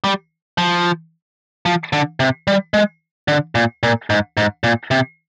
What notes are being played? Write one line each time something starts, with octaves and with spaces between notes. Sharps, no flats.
G3
F3
F3
D3
C3
G3
G#3
D3
A#2
A#2
G#2
G#2
A#2
C3